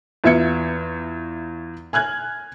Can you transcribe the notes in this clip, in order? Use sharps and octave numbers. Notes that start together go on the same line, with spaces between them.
E2 F4 E5 G#6 C#7
G#5 F6 F#6 G#6